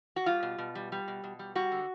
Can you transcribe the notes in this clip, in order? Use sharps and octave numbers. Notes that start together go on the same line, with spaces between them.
F#4
G3 F4
B2
B2
G3
G3
B2
B2
G3
G3 F#4
D3